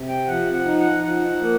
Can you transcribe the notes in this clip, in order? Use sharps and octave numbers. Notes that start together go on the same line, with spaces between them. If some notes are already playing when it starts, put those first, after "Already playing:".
Already playing: C3
G5
F3 F#5
F#5
D#4
F#5
F3 F#5
A#3